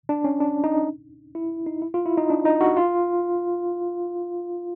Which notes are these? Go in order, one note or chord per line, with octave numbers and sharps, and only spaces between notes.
D4
C#4
D4
D#4
E4
D#4
E4
F4
E4
D#4
D4
D#4
F#4
F4